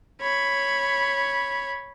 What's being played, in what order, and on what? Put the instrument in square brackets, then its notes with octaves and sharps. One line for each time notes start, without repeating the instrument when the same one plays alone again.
[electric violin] C#5 B5